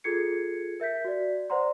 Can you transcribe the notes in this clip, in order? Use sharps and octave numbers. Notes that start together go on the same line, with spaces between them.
F4 G#4 A4 G#6 C7 C#7
A#4 E5 G6 B6
F#4 D5
B4 C5 D5 F#5 A#5 C6